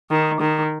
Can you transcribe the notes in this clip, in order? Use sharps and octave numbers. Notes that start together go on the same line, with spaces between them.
D#3
D#3